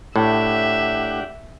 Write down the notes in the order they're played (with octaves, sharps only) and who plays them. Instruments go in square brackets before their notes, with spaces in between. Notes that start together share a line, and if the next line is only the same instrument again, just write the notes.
[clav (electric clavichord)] A2 [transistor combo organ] D4 G4 F#5 [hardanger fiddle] E5